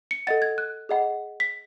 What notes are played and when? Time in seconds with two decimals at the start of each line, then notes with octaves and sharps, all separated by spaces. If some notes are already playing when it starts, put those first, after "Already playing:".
0.11 C#7
0.27 A4 D#5 F#5 A6
0.42 G#6
0.58 F#6
0.89 G#4 D#5 F#5
1.40 B6